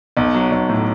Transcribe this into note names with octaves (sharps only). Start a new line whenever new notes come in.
B1
F#3
B1
A2